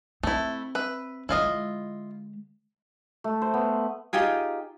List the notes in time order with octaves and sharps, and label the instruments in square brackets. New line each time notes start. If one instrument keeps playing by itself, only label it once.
[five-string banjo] A3 E4 [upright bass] C4
[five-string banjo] B4 E5
[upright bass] D3 G#3 [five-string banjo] E4 F4 D#5
[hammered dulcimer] A3
C5
B3
[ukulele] D#4 F4 G4 G#4